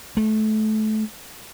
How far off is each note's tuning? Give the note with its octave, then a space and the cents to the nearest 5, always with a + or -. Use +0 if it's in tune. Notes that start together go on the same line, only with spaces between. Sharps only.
A3 -25